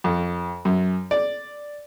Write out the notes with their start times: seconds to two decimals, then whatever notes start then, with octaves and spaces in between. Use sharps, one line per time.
0.04 F2
0.65 F#2
1.11 D5